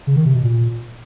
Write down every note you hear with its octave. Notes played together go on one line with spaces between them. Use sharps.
C#3
D#3
C3
B2
A#2